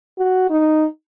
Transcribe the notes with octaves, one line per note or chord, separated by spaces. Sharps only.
F#4
D#4